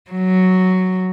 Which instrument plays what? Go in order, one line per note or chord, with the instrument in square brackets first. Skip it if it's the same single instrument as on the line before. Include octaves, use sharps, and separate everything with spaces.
[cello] F#3